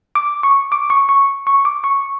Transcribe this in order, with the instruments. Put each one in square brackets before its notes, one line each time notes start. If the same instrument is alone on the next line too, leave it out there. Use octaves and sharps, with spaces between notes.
[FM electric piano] D6
C#6
D6
C#6
C#6
C#6
D6
C#6